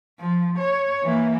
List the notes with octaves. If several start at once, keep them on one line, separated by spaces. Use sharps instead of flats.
F3
C#5
E3 A#3